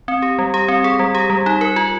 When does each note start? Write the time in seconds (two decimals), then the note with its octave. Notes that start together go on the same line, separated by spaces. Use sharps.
0.08 C4
0.22 G4
0.39 G3
0.54 G4
0.68 C4
0.84 G#4
0.99 G3
1.15 G4
1.30 G3
1.46 D#4
1.61 A#4
1.76 F4